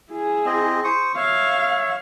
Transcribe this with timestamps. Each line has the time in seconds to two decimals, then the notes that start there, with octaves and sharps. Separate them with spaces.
0.11 E4 G#4
0.46 C4 D#5
0.84 C5 C#6 D#6
1.17 C#5 E5 F5